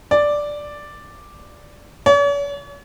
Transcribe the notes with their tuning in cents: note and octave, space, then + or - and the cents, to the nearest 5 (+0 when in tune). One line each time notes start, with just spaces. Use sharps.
D5 +0
C#5 +45